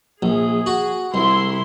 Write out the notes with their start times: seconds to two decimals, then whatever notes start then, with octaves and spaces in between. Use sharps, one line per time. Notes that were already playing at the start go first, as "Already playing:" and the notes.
0.22 A#1 G#4
0.66 F#4
1.14 C2 E4 C6